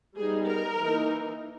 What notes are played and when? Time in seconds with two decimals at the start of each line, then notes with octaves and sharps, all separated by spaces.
0.16 G3 B3 D#4 G#4
0.47 A#4
0.77 E3 A#3 D#4